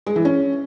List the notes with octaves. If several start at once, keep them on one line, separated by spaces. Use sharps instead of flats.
G#3
E3
C#4